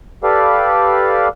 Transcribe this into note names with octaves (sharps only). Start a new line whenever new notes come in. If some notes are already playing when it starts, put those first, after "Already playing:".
G4 A4 B4 D5 F5